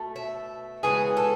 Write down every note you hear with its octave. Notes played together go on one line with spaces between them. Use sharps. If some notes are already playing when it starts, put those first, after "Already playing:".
Already playing: B2 A3
E5
C#3 E3 G#3 B3 G#4
A4